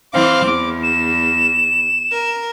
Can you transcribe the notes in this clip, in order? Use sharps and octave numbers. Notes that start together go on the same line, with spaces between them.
E3 C4 F5 D6
E2 D6
E7
A#4